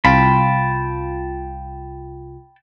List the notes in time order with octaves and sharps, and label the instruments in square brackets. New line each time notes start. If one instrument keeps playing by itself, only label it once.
[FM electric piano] C2 F4 [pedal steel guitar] G5 A5 B5